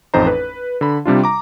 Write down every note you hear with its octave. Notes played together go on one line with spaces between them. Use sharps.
A1 F2 D#4 C5 A#5
B4
D3 B5
C3 G3 D4 F4
A#5 D6